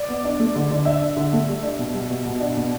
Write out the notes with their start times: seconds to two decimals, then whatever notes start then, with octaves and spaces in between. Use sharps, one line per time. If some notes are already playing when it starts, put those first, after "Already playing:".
Already playing: D5
0.09 B3
0.25 D4
0.40 A3
0.55 D3
0.71 D3
0.85 D4 E5
1.02 D4
1.16 D3
1.33 A3
1.48 G3
1.63 D4
1.79 B2
1.94 G3
2.10 B2
2.26 B2
2.40 D4
2.57 B2